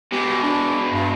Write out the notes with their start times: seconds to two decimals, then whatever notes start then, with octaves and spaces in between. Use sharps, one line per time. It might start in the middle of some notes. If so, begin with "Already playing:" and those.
0.12 B2 G#3 G4
0.42 D4
0.92 G2